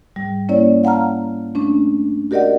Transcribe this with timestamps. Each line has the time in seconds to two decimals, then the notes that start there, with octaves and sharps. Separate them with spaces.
0.16 G#2 G3
0.49 A#3 C#4 E4 C#5 D5
0.84 F5 F#5 A5 A#5 F6
1.55 A3 C#4 D4
2.31 F#4 G4 A#4 D5 D#5 F#5